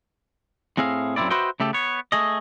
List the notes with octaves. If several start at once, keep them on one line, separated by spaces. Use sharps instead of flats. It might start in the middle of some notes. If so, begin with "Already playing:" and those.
A2 C4 G#4 E5 F5
F#2 A#2 C#3 C4 E4 D5
F#4 B4 C5 D#5 E5 G5
C#3 A3 G4 A4
B3 C#5
A3 G#4 D#5